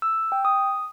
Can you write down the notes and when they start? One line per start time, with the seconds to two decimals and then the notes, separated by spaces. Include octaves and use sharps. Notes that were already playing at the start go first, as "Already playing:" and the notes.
0.02 E6
0.32 G5
0.45 D#6